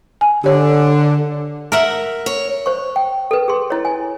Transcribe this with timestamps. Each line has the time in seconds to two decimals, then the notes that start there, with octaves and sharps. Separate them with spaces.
0.21 G#5
0.44 D3 G4 C#5
1.72 A#4 E5 F#5
2.26 C#5
2.66 C5 C#6
2.96 G5
3.31 A4 B4
3.48 G#4 C6
3.70 E4 C#5
3.85 G#5